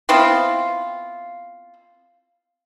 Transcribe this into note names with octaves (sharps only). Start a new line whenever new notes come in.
B3 C4 E4 F4